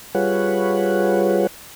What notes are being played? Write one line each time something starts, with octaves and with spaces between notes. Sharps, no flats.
G3 F4 G#4 B4 C#5 F#5